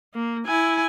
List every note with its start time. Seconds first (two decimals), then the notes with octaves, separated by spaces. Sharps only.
0.14 A#3
0.47 E4 G#5